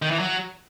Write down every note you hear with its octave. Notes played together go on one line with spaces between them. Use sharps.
D#3
E3
F#3